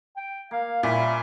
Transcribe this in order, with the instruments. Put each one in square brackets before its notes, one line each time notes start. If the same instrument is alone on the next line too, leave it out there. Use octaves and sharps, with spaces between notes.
[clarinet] G5
[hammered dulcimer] A#3 [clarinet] F5
[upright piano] A#2 [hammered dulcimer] G3 C#4 B4 [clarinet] E5